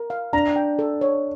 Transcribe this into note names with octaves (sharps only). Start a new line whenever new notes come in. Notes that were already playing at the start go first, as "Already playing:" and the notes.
Already playing: A#4
F5
D4 A#5
G5
A4
C#5